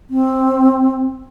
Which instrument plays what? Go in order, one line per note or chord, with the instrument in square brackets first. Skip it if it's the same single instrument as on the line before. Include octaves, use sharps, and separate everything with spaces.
[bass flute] C4